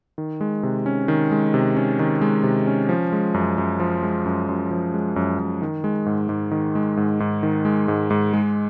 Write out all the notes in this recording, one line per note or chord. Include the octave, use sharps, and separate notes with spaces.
D#3
G#3
C3
C#4
D#3
G#3
C3
C#4
D#3
G#3
C3
C#4
F3
G#3
F#2
F#2
F3
G#3
F#2
F#2
F3
G#3
F#2
F#2
D#3
G#3
G#2
G#2
D#3
G#3
G#2
G#2
D#3
G#3
G#2
G#2
G#3